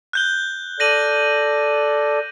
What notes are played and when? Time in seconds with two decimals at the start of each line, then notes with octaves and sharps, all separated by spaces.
0.13 F#6 G6 G7
0.80 A4 D5 A#6 D#7 F#7